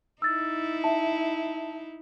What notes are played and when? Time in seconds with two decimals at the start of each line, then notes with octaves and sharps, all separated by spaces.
0.22 D#4 E4 E6 A6
0.84 E5 A5